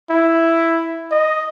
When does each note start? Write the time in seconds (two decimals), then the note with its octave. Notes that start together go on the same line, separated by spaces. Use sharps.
0.10 E4
1.11 D#5